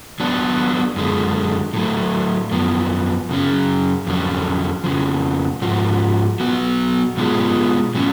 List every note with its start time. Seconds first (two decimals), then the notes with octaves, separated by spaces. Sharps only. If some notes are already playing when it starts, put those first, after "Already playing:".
0.20 F#3 B3 D4
0.96 F#2 D3 G#3
1.74 A2 F#3 A3
2.51 F#2 F3 B3
3.29 F#2 C#3 F#3 C#4
4.07 F2 D3 F#3 C#4
4.84 F2 C#3 F3
5.62 G#2 F3 F#4
6.40 F#3 B3 F#4
7.17 B2 G#3 B3 F4 G#4
7.95 A2 F#3 C#4